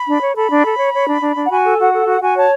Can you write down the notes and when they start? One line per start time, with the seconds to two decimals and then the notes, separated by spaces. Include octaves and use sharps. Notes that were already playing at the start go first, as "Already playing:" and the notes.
Already playing: B5
0.08 D4
0.22 C#5
0.36 A4 B5
0.50 D4
0.65 A4
0.79 C#5
0.94 C#5
1.08 D4
1.21 D4
1.36 D4
1.44 F#5
1.51 F#4 G#5
1.64 A4
1.79 F#4 F#5
1.93 A4
2.07 F#4 F#5
2.21 F#4 G#5
2.36 C#5 A5